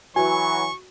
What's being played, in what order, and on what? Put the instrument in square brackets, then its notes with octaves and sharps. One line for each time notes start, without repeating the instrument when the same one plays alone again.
[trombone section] E3 F#3 [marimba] F#4 [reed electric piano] G#5 [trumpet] C#6